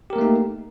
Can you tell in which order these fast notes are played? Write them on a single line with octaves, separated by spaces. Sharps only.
G4 A#4 A#3 A3 D#4